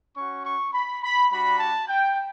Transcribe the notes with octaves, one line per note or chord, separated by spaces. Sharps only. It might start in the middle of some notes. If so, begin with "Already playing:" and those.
C#4 F#4 C#6
C#6
B5
B5
G3 D4 F#4 B5
A5
G5